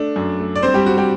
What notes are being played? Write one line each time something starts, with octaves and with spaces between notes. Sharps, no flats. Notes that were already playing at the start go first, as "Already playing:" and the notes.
Already playing: A3 D4
F#2
A3
D5
G2 C4 C5
G3 G4
C4 F#4
G3 G4